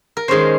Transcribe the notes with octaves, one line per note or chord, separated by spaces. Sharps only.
A#4
D#3 G#3 C#4 C5